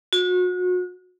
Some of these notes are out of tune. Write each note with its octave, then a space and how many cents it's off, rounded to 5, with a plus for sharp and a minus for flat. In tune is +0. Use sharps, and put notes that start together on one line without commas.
F#4 -35